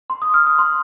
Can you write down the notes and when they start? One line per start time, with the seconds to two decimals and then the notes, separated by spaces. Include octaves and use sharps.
0.10 C6
0.22 D#6
0.34 F6
0.47 D#6
0.59 C6